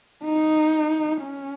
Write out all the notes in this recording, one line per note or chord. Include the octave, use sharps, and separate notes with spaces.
D#4
C#4